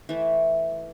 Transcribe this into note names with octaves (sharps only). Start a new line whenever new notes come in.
E3 A3 E5